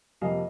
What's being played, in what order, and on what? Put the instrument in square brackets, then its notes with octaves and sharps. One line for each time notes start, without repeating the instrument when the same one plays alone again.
[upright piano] F2 C3 F3 A#3 D#5 F5